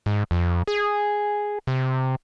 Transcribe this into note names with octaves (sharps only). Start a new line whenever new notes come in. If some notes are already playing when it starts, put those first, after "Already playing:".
G#2
F2
G#4
C3